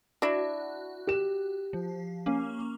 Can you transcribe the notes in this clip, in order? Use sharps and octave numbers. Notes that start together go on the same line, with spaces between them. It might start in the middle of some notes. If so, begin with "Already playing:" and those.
D4 E4 F#4
G4 E7
F3
A#3 C#4